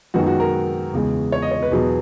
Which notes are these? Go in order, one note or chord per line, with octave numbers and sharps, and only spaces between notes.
F#2 D#3 G#3 B3 F#4
F#4
A#4
E2 C#3 G#3
C#5
D#5
C#5
B4
E2 B2 F#3 B3 G#4